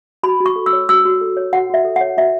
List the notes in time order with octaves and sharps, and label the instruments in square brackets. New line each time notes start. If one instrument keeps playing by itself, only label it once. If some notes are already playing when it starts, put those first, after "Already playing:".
[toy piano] F#4 B5
F#4
C#6
A4
E6
C#5
F#4 E6
F#4
A4
C#5
F#4 F#5
F#4 E5
A4
C#5 F#5
F#4 E5